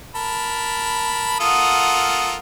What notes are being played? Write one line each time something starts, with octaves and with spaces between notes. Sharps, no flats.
A#4 A5 B5
F4 A4 A#4 F#5 D#6